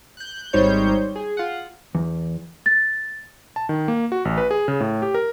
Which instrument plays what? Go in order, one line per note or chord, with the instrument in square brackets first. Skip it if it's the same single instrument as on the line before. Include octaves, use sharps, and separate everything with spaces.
[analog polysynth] F#6 G6
G#1 G3 D#4 C5 C#5 G6
G#4
F4 F#5
[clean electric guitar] E2
[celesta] A6
[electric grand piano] A5
D#3
A#3
F#4
A1
B4
G#4
C#3
A2
G4
A#4